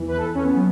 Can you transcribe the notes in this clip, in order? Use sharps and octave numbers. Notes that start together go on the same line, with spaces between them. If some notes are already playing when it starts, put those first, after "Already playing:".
Already playing: E2 E3
B4
A4
C#4
B3
F#3